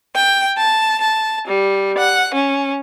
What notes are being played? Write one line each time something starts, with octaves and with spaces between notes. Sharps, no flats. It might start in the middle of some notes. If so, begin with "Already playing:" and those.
G5
A5
A5
G3
F#5
C#4